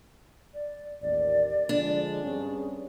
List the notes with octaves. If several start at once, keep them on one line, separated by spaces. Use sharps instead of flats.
D5
A1 D#2 D5
D3 F3 G#3 D4
G2 C4 C#4 G#4